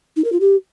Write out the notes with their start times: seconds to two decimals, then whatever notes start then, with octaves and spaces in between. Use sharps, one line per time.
0.16 D#4
0.24 A#4
0.32 F4
0.40 G4